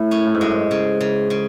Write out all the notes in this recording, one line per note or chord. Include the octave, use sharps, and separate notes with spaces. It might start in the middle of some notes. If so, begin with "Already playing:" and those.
Already playing: A2
C#4
A2
G#2
F#2 G#3
G#2
C#3
C#3
C#3